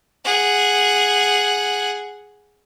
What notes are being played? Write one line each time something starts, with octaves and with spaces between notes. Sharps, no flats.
G#4 F#5